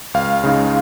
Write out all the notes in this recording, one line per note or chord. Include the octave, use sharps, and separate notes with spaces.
C#2 F5
C#3 G#3 D#4